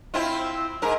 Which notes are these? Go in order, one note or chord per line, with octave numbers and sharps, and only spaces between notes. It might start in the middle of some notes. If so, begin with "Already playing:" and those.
C4 E4 F4
G#2 A#4